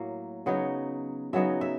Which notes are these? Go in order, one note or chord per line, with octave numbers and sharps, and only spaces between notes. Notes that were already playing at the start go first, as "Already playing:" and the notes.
Already playing: A2 F#3 A#3 F5
C#3 F#3 B3 D#4
C#3 F#3 B3 D#4 E5
E5